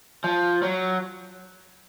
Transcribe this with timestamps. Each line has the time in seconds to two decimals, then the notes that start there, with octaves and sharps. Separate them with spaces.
0.24 F3
0.63 F#3